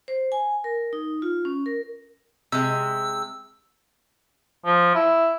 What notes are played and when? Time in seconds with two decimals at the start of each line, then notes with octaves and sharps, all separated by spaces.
0.08 C5
0.32 G#5
0.64 A#4
0.93 D#4
1.22 F4
1.45 C#4
1.66 A#4
2.52 C3 G#3 E6
4.65 F3
4.95 E4